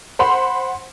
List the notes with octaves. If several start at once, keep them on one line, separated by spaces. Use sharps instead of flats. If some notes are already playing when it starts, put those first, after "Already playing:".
C5 F#5 B5 C6